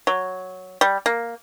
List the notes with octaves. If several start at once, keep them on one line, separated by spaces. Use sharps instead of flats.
F#3
G3
A#3